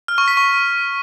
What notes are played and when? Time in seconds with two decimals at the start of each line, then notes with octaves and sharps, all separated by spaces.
0.08 F6
0.18 C#6
0.28 B6
0.37 C#6